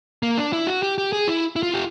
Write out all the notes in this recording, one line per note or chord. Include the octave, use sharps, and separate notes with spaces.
A#3
D4
E4
F#4
G4
G4
G#4
E4
E4
F4
G4